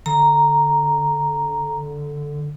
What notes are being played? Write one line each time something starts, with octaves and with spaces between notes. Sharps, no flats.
D3 A#5